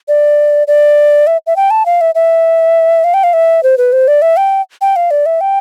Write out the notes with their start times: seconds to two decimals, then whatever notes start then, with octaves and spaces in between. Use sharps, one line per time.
0.08 D5
0.67 D5
1.27 E5
1.47 E5
1.56 G5
1.71 A5
1.86 F5
2.01 E5
2.15 E5
3.04 F5
3.14 G5
3.24 F5
3.33 E5
3.63 C5
3.78 B4
3.93 C5
4.08 D5
4.22 E5
4.37 G5
4.81 G5
4.96 F5
5.11 D5
5.26 E5
5.41 G5